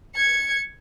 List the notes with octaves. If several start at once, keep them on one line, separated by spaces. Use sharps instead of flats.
G#6 C#7